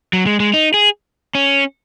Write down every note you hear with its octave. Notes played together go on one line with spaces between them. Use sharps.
F#3
G#3
G#3
D#4
G#4
C#4